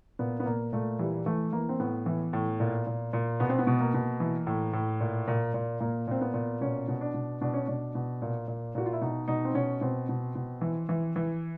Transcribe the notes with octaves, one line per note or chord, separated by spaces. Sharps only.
A#2 B3
B3
A#2 A#3
A#2 A3
E3 G3
E3 A3
E3 A#3
C4
A2 B3
E3
A2
A#2
A#2
A#2
B2 B3
C4
B3
B2
A#3
B2
E3
A2
A2
A#2
A#2
A#2
A#2 A#3
A#2 C4
B3
A#2
B2 C#4
B2
D4
B2
B2 D4
C#4
B2 D4
B2
A#2
A#2
A#2 F#4
F4
E4
B2 D#4
B2 D#4
C4
B2 C#4
B2 C4
B2
B2
E3
E3
E3